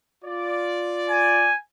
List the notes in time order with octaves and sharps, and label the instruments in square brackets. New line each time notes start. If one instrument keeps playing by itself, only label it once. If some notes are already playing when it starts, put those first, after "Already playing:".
[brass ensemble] F4 D5
[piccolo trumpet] G#5